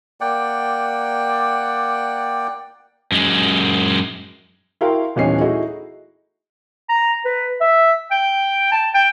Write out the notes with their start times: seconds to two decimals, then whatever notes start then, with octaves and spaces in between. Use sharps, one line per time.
0.21 A#3 D5 F#5 G5
3.12 F#2 G#3
4.81 E4 F#4 A#4 F5 G5 C6
5.16 D#1 E3 B3 C#4 D#4 C7
5.40 A3 D#4 E4 F#4 G#4
6.89 A#5
7.25 B4
7.61 E5
8.11 G5
8.72 A5
8.95 G5